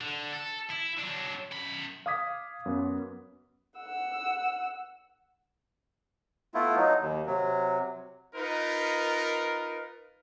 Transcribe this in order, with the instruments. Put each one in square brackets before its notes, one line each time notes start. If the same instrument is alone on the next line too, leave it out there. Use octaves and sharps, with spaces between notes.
[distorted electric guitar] D3
A4
E4
F#3 D4
F#2 B5
[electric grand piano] F5 D6 D#6 G#6 B6
F#2 B3
[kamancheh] F#5 E6
[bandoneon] A3 B3 E4 F4
F#3 D#4
D#2
C3 F#3
[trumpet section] D#4 F4 A#4 B4